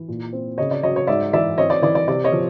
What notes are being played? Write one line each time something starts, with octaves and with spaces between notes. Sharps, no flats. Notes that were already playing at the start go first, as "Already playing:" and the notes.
Already playing: E3
A#2
C4
C#3 C#5 D#5
D5
F#3 C#5 D#5
C#5
G#2 D5 E5
E3 D5 E5
C4 C#5 D#5
D5
E3 D5
D5
C3 D5
C#5 D#5
F3